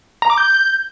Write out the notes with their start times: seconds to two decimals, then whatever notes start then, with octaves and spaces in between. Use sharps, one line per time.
0.22 A#5
0.30 D6
0.38 G6